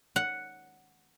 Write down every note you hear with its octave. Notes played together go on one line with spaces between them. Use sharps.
F#5